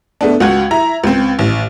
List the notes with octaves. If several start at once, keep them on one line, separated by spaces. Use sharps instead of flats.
A3 B3 D4
C#2 F#4 F#5 G#6
E4 A#5
C#2 C4
A1